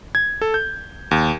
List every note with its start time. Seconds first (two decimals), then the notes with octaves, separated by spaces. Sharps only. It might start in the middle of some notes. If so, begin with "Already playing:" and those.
0.15 G#6
0.42 A4
0.54 G6
1.11 D#2